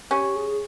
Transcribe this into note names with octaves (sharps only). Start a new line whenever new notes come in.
C#4 G4
G#4